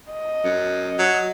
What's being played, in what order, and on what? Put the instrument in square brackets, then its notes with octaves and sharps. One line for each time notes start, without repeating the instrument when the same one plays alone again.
[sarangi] D#5
[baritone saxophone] F#2
F#3